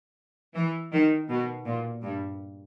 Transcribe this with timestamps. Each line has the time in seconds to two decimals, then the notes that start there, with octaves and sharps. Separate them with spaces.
0.55 E3
0.92 D#3
1.29 B2
1.65 A#2
2.02 G2